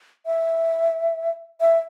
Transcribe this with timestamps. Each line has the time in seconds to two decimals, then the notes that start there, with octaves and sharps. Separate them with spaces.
0.26 E5
1.61 E5